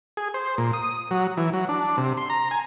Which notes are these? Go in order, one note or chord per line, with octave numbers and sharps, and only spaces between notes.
G#4
C5
A#2
D#6
F#3
E3
F#3
D4
C3
C6
A#5
G#5